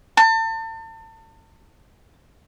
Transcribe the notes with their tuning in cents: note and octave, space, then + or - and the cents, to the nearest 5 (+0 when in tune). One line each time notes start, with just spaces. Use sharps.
A5 +35